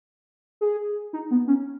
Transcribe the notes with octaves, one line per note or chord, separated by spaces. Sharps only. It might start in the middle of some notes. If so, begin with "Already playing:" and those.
G#4
D#4
B3
C#4